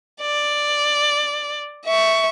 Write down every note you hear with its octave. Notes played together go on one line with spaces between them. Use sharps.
D5
E5 C#6